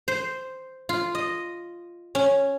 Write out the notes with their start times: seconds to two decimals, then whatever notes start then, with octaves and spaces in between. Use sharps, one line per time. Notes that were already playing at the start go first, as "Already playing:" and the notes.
0.08 C5
0.89 F4
1.15 D#5
2.15 C#4